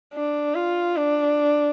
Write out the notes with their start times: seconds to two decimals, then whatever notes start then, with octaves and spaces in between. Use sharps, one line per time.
0.14 D4
0.55 F4
0.96 D4